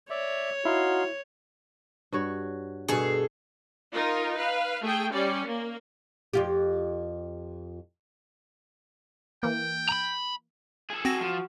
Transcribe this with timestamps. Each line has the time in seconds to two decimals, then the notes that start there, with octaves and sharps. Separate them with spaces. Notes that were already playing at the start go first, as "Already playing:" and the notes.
0.10 C#5 D5 E5
0.65 D#4 E4 F#4 F5 C6
2.12 G2 F#4 C#5
2.88 G2 B2 G#4 A4
3.93 D#4 F4 A#4
4.36 B4 F5
4.83 A3 G#4 G5
5.13 G3 C#4 D5
5.46 A#3
6.33 F2 F4 G4
9.43 E3 A#3 G5
9.89 A#5 B5
10.90 G#4 A4
11.05 C4 F#4 A#6
11.20 F3